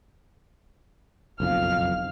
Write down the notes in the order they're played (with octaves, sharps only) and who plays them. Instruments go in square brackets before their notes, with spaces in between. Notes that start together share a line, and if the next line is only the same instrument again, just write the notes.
[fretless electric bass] F#1 B1 F2 [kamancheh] F5 F6